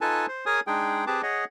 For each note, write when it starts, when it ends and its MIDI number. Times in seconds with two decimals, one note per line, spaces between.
0.01 0.26 63
0.01 0.26 65
0.01 0.26 69
0.01 0.26 71
0.01 0.26 80
0.01 0.26 81
0.28 0.45 72
0.46 0.60 68
0.46 0.60 70
0.46 0.60 73
0.46 0.60 80
0.46 0.60 87
0.67 1.05 56
0.67 1.05 62
0.67 1.05 63
0.67 1.05 68
0.67 1.05 79
1.07 1.22 60
1.07 1.22 67
1.07 1.22 68
1.07 1.22 71
1.07 1.22 81
1.07 1.22 86
1.23 1.45 68
1.23 1.45 73
1.23 1.45 75
1.23 1.45 78